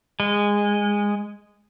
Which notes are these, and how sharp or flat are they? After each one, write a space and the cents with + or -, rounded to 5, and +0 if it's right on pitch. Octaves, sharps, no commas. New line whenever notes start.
G#3 -15